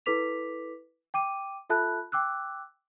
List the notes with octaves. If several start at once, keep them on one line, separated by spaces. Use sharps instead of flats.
E4 A4 B4 D6 B6 F7
G5 D6 D#7
F4 A4 E5 A5 B5 F#6
G5 D6 E6 F#6